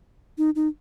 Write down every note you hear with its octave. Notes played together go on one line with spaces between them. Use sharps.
D#4
D#4